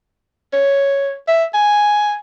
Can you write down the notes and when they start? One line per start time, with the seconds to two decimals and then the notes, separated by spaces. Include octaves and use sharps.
0.53 C#5
1.28 E5
1.54 G#5